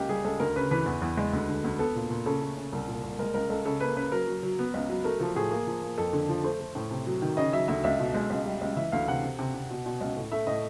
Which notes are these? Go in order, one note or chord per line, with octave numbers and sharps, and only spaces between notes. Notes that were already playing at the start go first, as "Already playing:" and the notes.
Already playing: C#2 A#3 G4
G3 G#4
C#2 A4
D2 A#4
C#3 B4
E3 B4
E2
E2
G#3
D2
D3
D2
B3 A4
A#2
A#2
C#3 A4
A3
C#3
C2
A#2
C2
G#3 A#4
C#2 A#4
C#2 A4
C#3 A4
A#3 B4
C#3 B4
F#3 A#4
F#3
F#3
B3
C#2
F#3
A3 A#4
F3 A4
A2 G#4
A#3
F3
A#3
F2 A4
D3
F3
A3 C5
A3
A2
C3
F#3
D#3
C#3 D#5
F#3 E5
D2 E5
C#2 E5
B2
G#3
C#2
G3
C#2
E3 E5
D2 F5
C3 F#5
C3
C3
C3
B2
B2
C#2
A2
A3 E5
A2 D#5